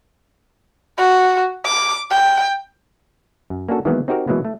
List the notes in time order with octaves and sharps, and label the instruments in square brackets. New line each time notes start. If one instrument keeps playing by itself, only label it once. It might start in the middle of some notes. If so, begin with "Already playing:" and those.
[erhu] F#4
D6
G5
[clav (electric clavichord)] F#2
A#3 C#4 D4 F#4 A4
D#3 E3 F#3 G#3 A#3 B3
C4 D#4 F#4 G4 A#4
B2 E3 F#3 G#3 A#3 B3
A3